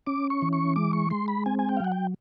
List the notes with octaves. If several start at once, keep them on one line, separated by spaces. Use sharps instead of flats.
C#4 D6
C#6
E3
C#6
G#3 D6
C#6
G#3 C6
B5
C4 G#5
G#5
G5
F5
F#3 F#5
G5